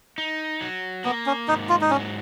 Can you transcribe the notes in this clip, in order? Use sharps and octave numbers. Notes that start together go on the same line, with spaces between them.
D#4
F#3
A#3 B3
C#4
G#2 D#4
F4
D#4
F#3 C#4